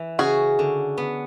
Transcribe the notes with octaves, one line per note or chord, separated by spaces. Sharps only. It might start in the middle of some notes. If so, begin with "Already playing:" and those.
Already playing: E3
C#3 F#4 G#4
D3
B3